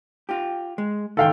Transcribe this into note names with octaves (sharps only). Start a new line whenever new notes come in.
F4 G4
G#3
C#2 G#2 D#3 A4 F5 G5